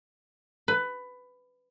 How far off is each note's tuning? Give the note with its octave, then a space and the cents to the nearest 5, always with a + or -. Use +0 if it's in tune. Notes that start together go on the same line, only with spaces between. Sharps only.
B4 +15